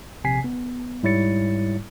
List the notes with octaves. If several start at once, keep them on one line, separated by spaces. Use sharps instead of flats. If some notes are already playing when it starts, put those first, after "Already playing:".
A#1 C3 G#5 B6 C7
B3
G#2 G3 E4 C#5 A6 C#7